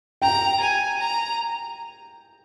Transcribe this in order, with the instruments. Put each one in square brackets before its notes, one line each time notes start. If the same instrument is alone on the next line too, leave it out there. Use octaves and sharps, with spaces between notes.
[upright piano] G5 [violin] A#5
[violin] G#5
A#5